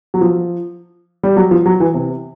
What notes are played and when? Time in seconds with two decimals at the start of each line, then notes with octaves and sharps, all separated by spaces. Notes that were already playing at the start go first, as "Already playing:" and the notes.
0.14 F#3
0.21 F3
1.23 G3
1.37 F#3
1.51 F3
1.66 F#3
1.80 E3
1.94 C3